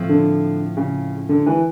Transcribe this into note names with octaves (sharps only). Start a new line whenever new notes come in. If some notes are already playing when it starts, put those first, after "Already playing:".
Already playing: A2 F3 A3 C4
D3
C#3
D3
E3